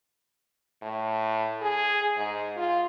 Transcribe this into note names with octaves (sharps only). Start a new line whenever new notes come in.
A2
G#4
G#2
F4